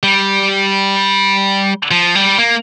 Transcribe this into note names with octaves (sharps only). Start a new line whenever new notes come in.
G3
F3
G3
A#3